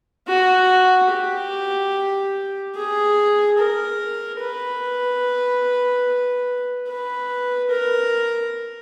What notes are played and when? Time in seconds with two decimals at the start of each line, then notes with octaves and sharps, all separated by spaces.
0.28 F#4
1.11 G4
2.76 G#4
3.58 A#4
4.41 B4
6.88 B4
7.71 A#4